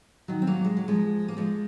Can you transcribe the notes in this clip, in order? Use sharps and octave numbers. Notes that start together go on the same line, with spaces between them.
D#3 F#3
C4
F#3 A#3
G#3
F#3
F3 G#3
A#3
F3 G#3